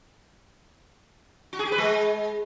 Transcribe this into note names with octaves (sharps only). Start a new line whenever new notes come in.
F#4
G#4
G4
B4
G#3